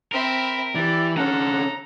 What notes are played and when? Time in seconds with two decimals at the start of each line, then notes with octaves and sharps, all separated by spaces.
0.12 C4 A#4 E5 B5
0.75 E3 G4 D5
1.17 D3 C#4 A4 F#5 A#5